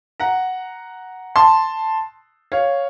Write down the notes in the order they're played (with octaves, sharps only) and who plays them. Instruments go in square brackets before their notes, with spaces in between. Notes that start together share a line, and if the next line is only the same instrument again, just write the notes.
[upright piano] F#5 A#5
A5 C6
C#5 F5